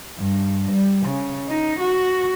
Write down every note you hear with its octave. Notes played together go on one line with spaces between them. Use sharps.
G2
G3
C#3
D#4
F#4